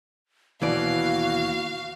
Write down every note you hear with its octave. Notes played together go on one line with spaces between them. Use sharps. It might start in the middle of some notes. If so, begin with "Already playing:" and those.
D#2 B2 E3 F#4 D5 F5